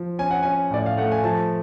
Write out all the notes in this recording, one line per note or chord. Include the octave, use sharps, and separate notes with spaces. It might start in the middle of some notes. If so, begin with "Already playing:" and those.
Already playing: F3
C#4 G#5
F#5
C#4 G#5
A2 D5
F5
A3 F#5
G#5
F3 A5